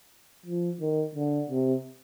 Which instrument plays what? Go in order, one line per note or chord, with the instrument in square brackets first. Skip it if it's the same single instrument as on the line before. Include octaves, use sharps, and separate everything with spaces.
[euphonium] F3
D#3
D3
C3